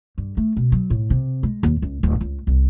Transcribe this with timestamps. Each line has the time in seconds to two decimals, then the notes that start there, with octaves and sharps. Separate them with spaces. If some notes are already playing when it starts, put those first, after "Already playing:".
0.18 G2
0.37 A3
0.57 B2
0.72 F#3
0.90 A2
1.10 C3
1.43 G#3
1.63 D#2
1.82 C#2
2.03 D1
2.21 C#2
2.47 C2